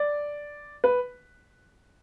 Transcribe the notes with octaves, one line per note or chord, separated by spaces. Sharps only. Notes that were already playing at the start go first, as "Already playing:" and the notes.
Already playing: D5
B4